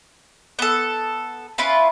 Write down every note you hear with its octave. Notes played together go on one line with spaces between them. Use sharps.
B3 A4
C#4 E4 F4 B4